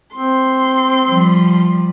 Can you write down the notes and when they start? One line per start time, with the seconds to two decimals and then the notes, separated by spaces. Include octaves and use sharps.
0.15 C4 C6
1.08 F3 G3